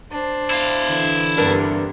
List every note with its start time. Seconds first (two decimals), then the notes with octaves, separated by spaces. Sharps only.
0.10 D4 C5
0.50 E4 F5
0.89 D3 E3
1.37 G2 C3 B3 D4 A#4 B4